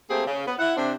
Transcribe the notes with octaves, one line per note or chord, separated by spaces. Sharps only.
A3 A#3 C4 G4 G#4
C#3
B3
E4 F#5
C3 C4 D4